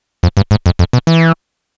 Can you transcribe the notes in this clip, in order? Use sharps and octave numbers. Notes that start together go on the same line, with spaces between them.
F2
G2
G#2
F2
F2
B2
E3